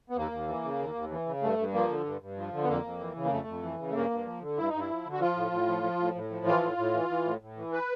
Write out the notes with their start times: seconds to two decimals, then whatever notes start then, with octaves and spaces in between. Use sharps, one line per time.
0.10 B3
0.16 D#2 A#3
0.32 D#2
0.48 E3
0.64 C#3
0.79 D#2
0.95 D#2
1.11 E3
1.26 C#3
1.42 G2 A3
1.59 G2
1.73 F3 A#3
1.89 D3
2.06 G2
2.21 G2
2.37 F3
2.53 D3
2.64 B3
2.69 F2 A#3
2.84 F2
2.99 E3
3.16 C#3
3.25 A#3
3.31 F2 A3
3.47 F2
3.62 E3
3.79 C#3
3.90 A3
3.95 G2 A#3
4.10 G2
4.25 F3
4.41 D3
4.57 G2 E4
4.69 G2 D#4
4.80 E4
4.90 F3
5.05 D3
5.13 F#4
5.20 F3 F4
5.36 A2
5.51 A2
5.68 F3
5.83 F3
6.00 A2
6.15 A2
6.30 F3
6.46 E3 F4
6.62 A2
6.77 A2
6.94 E3
7.09 E3
7.25 A2
7.41 A2
7.57 E3
7.73 B4